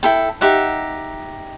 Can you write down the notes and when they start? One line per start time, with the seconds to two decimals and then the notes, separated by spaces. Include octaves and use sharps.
0.03 E4 A4 G5
0.41 D#4 G4 E5 F#5